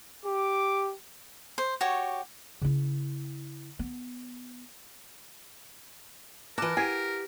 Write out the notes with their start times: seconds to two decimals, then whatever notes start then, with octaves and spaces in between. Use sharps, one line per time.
0.25 G4 D6
1.58 C5
1.81 F#4 G4 C#5
2.61 C#3 E4
3.79 B3
6.58 E3 A#4 A5 D6 F#6 A#6
6.77 E4 G4 F#5 G#5 C7